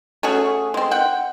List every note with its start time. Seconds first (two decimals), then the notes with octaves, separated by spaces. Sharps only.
0.23 A3 C#4 F#4 G#4
0.74 G#3 C4
0.91 F#5 G5